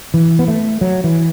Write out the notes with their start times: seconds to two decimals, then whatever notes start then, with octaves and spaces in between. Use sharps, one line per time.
0.14 E3
0.39 B3
0.48 A3
0.81 F#3
1.04 E3